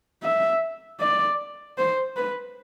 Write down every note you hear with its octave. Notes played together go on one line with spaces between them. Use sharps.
E5
D5
C5
B4